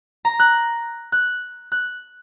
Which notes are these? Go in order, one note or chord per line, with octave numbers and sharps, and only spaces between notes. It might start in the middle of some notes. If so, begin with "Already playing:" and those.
A#5
F#6
F#6
F#6